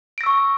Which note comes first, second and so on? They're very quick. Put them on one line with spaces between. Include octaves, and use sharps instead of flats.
D7 A#6 E6 C#6